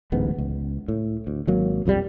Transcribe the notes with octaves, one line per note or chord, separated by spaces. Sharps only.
D1 A1 G#2 B3
C#2
A2
D2
G#1 F#3 A#3
B1 F2 E3 G3